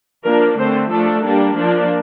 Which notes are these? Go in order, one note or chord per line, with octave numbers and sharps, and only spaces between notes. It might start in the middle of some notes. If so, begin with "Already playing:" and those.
F3 A#3 D4 A#4
D3 A3 C4 C5
F3 A3 D4 A4
G3 A#3 D4
F3 A#3 D4